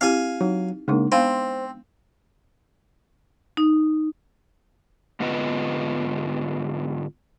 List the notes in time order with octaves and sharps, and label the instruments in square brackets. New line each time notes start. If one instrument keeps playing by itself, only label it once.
[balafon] C4 E4 G4 [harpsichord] F5 G#5
[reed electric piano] F#3 [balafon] D#4
[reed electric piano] C#3 A#3 [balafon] G#3 D4 D#4
[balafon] B3 F5 B5 [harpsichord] C4 [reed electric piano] C5
[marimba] D#4
[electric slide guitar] G#2 D3 B3 F4 B4 D#5